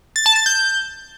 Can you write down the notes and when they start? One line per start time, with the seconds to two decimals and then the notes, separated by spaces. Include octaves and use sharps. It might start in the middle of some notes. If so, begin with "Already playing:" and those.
0.16 A6
0.26 A5
0.36 A6
0.46 G6